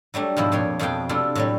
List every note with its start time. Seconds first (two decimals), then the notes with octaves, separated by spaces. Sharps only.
0.14 F#3 G3 A3 D4
0.37 G#2 B2 F3 E4
0.52 F2 A#2 G#4 C#5 G5
0.79 F2 B2 F3 G#4 G5 A5
1.09 C3 A3 D4 E4 F4
1.35 A2 F#3 G3